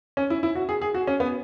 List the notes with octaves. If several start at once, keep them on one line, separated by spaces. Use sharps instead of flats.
C#4
E4
E4
F#4
G#4
G#4
F#4
C#4
B3